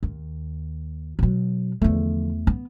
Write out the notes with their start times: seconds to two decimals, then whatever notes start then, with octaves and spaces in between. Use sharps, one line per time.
0.03 D#2
1.19 B2 F#3
1.82 E2 D3 F3 A3
2.47 B3